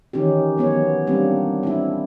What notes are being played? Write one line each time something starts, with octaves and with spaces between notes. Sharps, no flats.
D#3 E3 C#4 D#4 G4
F#3 B3 C#5
G3 A#3 C4 D4 G4
C4 D4 E4